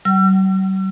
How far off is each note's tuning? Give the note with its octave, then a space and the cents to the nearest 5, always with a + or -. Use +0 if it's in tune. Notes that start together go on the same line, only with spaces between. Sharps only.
G3 -45 F#5 +35 E6 +40